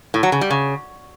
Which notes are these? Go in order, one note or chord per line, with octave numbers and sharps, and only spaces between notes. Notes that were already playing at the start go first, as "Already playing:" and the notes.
A2
F#3
C#3
G3
C#3